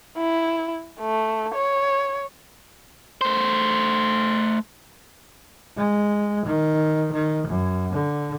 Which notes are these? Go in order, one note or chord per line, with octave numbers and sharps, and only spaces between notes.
E4
A3
C#5
A3 C5
G#3
D#3
D#3
F#2
D3